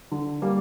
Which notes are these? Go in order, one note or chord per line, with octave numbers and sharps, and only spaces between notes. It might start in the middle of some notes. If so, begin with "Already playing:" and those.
D3
G3 A#3